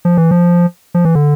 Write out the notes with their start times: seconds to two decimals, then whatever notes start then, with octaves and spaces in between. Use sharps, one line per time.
0.05 F3
0.17 E3
0.31 F3
0.94 F3
1.05 E3
1.15 D3